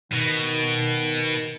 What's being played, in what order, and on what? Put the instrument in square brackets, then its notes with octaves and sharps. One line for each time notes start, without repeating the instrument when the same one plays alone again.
[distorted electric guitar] B2 [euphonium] D#3